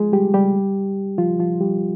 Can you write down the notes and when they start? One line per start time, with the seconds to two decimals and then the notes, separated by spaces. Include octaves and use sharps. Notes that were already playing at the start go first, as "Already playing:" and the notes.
Already playing: F3 G#3 F4 G#4
0.12 G3 G4
0.34 G3 G4
1.18 F3 F4
1.39 F3 F4
1.61 G3 G4